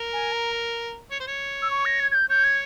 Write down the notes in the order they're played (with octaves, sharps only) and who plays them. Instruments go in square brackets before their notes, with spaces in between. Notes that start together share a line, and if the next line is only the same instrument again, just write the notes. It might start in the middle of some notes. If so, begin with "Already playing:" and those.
Already playing: [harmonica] A#4
[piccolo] G#5
A#5
[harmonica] C#5
C5
C#5
[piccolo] E6
C#6
A#6
G#6
G#6
G6
[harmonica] C#5 [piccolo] G6
[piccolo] G#6